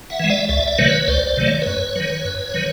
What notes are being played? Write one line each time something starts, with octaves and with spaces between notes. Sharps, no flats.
E5 F#5
E3 G#3
D5 E5
C#2 D5 E5
D5
C3 D#3 F#3 A3 B4 C#5
C#2 C5 D5
C5 D5
C3 D#3 F#3 A3
C#5
D5
F#2 B4 C#5
D#3 F#3
F#2
D#3 F#3